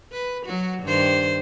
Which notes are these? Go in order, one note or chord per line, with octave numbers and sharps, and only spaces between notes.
B4
F#3 F#4
G2 D#3 C5